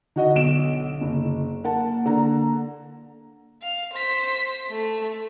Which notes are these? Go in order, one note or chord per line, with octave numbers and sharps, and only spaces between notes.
D3 D#4 F#4 D#5
B1 D7 E7
F#1
A#3 A#4 F#5 A5
D3 A#5
F5
C5 B6
A3